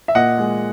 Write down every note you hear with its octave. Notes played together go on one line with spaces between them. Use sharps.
E5
A#2 D#5 F#5
G#3